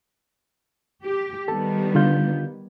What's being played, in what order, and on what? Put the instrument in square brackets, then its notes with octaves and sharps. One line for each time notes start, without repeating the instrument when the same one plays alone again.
[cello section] G4
[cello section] D#3 G3 B3 [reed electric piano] A4 A5
[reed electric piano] D3 F4 G6